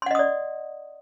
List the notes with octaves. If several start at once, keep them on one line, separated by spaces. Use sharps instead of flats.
D5 D#5 F#5 C6 D#6